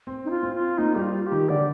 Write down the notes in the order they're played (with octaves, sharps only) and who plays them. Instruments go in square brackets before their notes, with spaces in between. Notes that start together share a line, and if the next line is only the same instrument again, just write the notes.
[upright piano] C4
[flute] D#4
F4
[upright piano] C4
[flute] F4
[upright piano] A#3 [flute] D#4
[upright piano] G3 [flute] G4
[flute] F4
G4
[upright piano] D#3
[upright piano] D3 [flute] D5